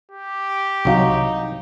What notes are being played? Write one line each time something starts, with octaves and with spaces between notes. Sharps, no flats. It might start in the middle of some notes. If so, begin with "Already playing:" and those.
G4
C2 F#3 D#4 C#5 F5 C#6